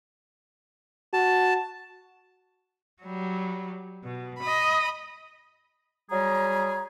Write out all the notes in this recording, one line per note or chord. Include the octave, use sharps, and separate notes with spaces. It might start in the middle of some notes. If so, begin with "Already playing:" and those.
F#4 A5
F#3 G3
B2
D#5 B5
F#3 G3 G#4 A#5